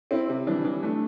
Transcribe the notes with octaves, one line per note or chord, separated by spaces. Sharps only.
C4 E4
C3
E3 G3 D4
E3
A3 D4